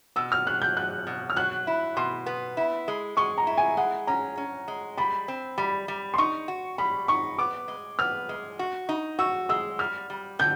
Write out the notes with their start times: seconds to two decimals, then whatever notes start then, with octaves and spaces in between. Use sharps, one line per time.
0.16 B2 E6
0.32 F6
0.47 F#3 F#6
0.62 G6
0.77 B2 F#6
1.07 B2
1.30 F6
1.36 F#3 F#6
1.67 E4
1.97 B2 C6
2.26 B3
2.57 E4
2.88 G#3
3.17 G#3 C#6
3.38 A#5
3.47 E4
3.58 G#5
3.77 G#3 F#5
4.07 C#4 A#5
4.37 C#4
4.68 G#3
4.98 G3 B5
5.28 C4
5.58 G3 B5
5.88 G3
6.14 C6
6.18 D#4 C#6
6.48 F#4
6.78 G3 B5
7.08 D#4 C#6
7.38 B3 D6
7.68 G#3
7.99 B3 F6
8.29 G#3
8.59 F#4
8.89 D#4
9.19 F#4 E6
9.49 G#3 E6
9.79 G3 F6
10.10 G3
10.39 D3 G6